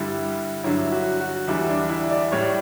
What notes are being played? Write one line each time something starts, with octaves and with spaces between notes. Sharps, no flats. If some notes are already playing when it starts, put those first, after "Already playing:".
Already playing: G2 D3 G3 E4
G2 D3 F#3 E4
F#4
F#4
E2 D3 G3 E4
D4
E4
D5
A2 G3 C#5